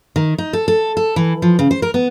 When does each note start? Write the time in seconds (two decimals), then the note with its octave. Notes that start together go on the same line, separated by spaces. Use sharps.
0.16 D#3
0.38 D#4
0.53 A4
0.68 A4
0.97 A4
1.16 E3
1.42 F3
1.59 C#3
1.71 C5
1.82 A#4
1.94 B3